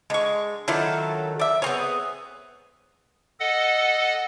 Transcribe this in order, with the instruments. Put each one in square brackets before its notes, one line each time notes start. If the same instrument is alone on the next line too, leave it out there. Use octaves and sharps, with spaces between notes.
[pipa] D3 C#6 [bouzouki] G#3
[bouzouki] D#3 F#3 A4 [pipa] D4 E4 F4
[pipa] D5 E5
[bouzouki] B3 G#4 [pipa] C4 C#5
[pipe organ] A4 D#5 F#5